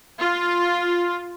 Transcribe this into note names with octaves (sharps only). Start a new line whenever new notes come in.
F4